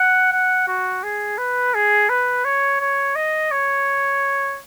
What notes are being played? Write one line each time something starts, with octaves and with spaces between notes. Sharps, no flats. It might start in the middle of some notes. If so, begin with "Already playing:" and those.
Already playing: F#5
F#5
F#4
G#4
B4
G#4
B4
C#5
C#5
D#5
C#5